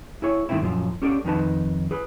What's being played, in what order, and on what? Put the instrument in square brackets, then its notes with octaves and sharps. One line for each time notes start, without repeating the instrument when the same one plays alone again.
[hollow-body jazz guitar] E4 G#4 C#5
G2 D#3 G3 A3 C4 E4
F#2 A#2 D3 F3
C#4 G4 A4 D5
F2 D#3 D#4 B4 A5
G#4 B4